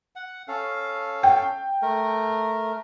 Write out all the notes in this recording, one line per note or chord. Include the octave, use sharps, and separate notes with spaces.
F#5
C#4 A4 F5
G5
A3 A#4